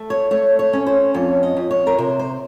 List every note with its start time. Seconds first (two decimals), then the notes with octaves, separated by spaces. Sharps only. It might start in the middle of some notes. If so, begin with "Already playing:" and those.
Already playing: A3
0.10 C#5
0.31 A3 C#5
0.59 C#5
0.73 C#4
0.87 C5
1.14 F2 C#5
1.43 D#5
1.57 F2
1.71 C#5
1.87 A#4
1.98 C3 C5
2.19 C5